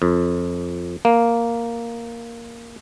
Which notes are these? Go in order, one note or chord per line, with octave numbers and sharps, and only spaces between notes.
F2
A#3